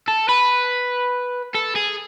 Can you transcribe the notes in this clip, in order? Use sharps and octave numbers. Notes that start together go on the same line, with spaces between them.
A4
B4
A4
G#4